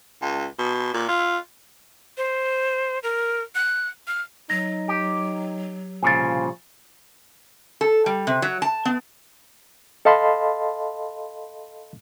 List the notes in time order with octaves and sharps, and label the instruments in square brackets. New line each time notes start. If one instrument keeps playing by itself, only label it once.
[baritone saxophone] C#2
B2
A#2
F4
[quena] C5
A#4
F#6
F6
[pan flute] F#3 [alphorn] D#4 [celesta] A#6
[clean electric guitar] G4
[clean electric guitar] C2 A#2 C#3 [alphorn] F3 [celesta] G#5 A6
[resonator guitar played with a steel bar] A4
G3
C3
F#3
A5
B3
[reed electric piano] A4 D#5 F5 A5 B5 C6